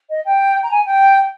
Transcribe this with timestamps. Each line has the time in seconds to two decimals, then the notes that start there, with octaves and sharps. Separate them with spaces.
0.09 D#5
0.25 G5
0.63 A#5
0.71 G#5
0.85 G5